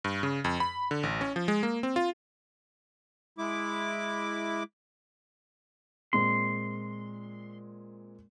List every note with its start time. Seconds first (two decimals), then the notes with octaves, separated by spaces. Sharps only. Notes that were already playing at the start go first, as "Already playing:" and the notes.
0.04 G2
0.23 C#3
0.45 F2
0.60 B5
0.91 D3
1.03 A1
1.21 C#4
1.36 F3
1.48 G#3
1.63 A#3
1.83 C4
1.96 F4
3.38 G#3 E4 D6
6.13 A#2 G#3 C4 C6